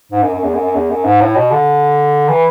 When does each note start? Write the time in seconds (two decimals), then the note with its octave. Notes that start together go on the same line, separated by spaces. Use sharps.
0.12 G#2
0.23 F#2
0.34 F#2
0.44 E2
0.55 F#2
0.65 F#2
0.75 E2
0.91 F#2
1.05 G#2
1.21 A2
1.36 B2
1.52 D3
2.29 E3